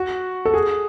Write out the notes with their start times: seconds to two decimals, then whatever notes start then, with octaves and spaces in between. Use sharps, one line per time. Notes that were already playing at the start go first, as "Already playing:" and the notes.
Already playing: F#4
0.45 A4
0.54 G#4